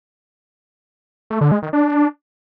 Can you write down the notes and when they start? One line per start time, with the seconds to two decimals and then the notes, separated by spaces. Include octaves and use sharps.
1.30 A3
1.41 D3
1.52 G#3
1.62 D#3
1.73 D4